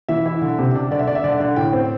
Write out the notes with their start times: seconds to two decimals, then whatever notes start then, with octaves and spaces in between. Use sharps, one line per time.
0.09 E3 E5
0.26 E4
0.42 D3
0.59 C3
0.75 D4
0.91 D3 D5
0.99 E5
1.07 D4 D5
1.15 E5
1.24 D3 D5
1.40 D3
1.56 A2 G5
1.73 C4